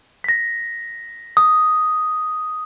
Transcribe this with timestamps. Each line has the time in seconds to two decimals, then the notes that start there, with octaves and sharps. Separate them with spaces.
0.24 A#6 B6
1.37 D#6